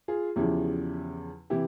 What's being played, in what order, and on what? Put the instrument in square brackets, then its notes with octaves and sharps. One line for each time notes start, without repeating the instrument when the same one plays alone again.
[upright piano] F4 G#4
E2 C#3 F3 E4 G4
C3 E3 E4 G4